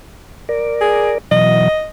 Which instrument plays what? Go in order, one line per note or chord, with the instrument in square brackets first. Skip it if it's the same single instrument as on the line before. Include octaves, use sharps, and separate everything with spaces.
[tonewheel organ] A#4 D5
[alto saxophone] G#4
[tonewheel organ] B2 E3 F#3 [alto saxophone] D#5